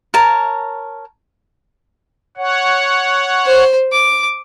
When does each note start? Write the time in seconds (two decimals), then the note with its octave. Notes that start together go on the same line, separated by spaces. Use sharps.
0.14 A#4 C#5 A5
2.37 C#5 F#5
3.45 C5
3.92 D6